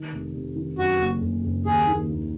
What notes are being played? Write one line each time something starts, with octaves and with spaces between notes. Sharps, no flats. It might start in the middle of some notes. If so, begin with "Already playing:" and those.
Already playing: D#3
F1
F1
D#3
F#2 F#4
F#1
F#1
F#1
D#2 G#4
D#3
D#2